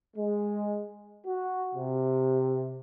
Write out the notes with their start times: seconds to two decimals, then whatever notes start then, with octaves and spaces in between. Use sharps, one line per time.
0.17 G#3
1.26 F#4
1.75 C3